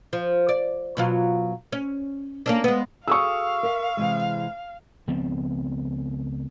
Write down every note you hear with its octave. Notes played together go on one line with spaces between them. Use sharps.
F3
D5
B2 F#3 F4
C#4
A#3 C#4 D4
G#3 B3
F#4 G#4 A4 F5 C#6 D#6 E6
A#4 E5
C3 E3 G#3
C#2 F3 B3 C4